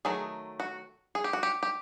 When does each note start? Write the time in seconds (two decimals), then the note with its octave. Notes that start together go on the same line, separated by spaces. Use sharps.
0.05 D#3 F#3 A3 G#4
0.60 F#4
1.15 G#4
1.24 G4
1.33 F#4
1.43 G4
1.63 G4